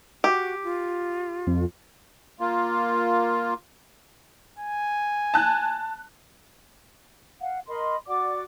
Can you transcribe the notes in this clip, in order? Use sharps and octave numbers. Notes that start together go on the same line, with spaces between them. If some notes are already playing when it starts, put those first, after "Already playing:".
F#4 G4
F4
F2
A#3 F4
G#5
A5 F#6
F5 F#5
A#4 D#5 B5 C6
F#4 D5 F#5 D6